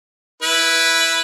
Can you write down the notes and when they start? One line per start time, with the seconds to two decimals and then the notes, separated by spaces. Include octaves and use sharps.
0.42 E4 B4